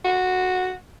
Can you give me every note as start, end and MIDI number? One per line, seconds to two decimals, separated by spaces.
0.05 0.72 66